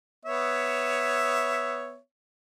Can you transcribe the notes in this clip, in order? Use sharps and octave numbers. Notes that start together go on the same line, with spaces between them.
B3 C#5 E5